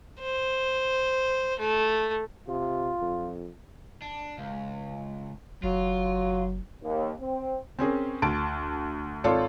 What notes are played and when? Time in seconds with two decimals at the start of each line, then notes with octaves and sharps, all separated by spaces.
0.21 C5
1.59 A3
2.48 C3 F4
3.02 F2
4.02 D4
4.38 C#2
5.63 F#1 F#3 F4
6.83 D#2
7.20 C4
7.79 C4 C#4 G#4 A#4
8.22 D2 A5 D7
9.24 G#1 F4 A4 C#5 D5